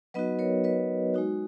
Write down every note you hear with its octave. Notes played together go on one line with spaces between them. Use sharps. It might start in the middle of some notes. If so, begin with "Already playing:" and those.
F#3 B3 D#4 F#4 B4 D#5
A#4 C#5
B4 D#5
G#3 D#4 F#4